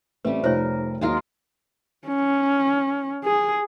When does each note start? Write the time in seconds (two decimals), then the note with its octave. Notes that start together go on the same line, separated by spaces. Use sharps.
0.25 A1 G3 A3 C4 B4
0.44 F1 D#4 F4 A#4 C5 C#5
1.01 D#2 F#3 G#3 F4 A#4 F6
2.07 C#4
3.24 G#4